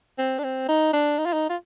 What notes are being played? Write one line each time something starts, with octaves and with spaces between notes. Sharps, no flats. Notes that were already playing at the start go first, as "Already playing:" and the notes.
C4
D4
C4
D#4
D4
D#4
F4
D#4
F4